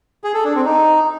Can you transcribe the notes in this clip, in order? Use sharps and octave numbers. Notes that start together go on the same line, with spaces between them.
G#4
A4
D4
C4
D#4